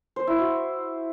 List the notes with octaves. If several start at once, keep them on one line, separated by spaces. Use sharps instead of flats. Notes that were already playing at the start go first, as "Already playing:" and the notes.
C5
E4
F#4